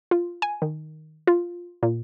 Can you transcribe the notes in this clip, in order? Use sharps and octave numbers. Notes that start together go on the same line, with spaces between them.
F4
G#5
D#3
F4
A#2